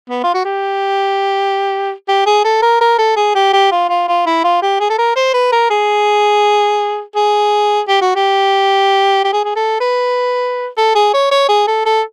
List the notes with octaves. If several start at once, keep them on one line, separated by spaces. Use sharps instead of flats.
B3
F4
F#4
G4
G4
G#4
A4
A#4
A#4
A4
G#4
G4
G4
F4
F4
F4
E4
F4
G4
G#4
A4
A#4
C5
B4
A#4
G#4
G#4
G4
F#4
G4
G4
G#4
G#4
A4
B4
A4
G#4
C#5
C#5
G#4
A4
A4